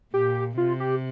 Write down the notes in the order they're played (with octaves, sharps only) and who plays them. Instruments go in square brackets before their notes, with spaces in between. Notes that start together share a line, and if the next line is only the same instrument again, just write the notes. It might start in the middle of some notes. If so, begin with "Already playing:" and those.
[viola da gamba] A#2 [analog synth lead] G4
[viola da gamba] C3 [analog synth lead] F4
[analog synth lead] G4